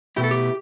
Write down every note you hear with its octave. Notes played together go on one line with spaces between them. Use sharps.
B2 A3 E4 G4
A4
G4